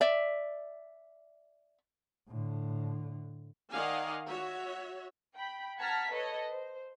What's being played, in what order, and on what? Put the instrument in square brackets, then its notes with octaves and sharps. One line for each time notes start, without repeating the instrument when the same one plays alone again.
[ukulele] D5 E5
[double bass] A2 D3
[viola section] D#3 D5 D#5 F5 F#5 G#5
F#4 C#5 E5
[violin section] G5 B5
F#5 A5 A#5 F6 G#6 B6
A4 B4 C#5 D#5
C5